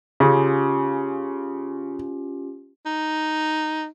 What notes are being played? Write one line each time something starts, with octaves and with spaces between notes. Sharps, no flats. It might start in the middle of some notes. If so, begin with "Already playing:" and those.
C#3 C#4 F4 G4
D#4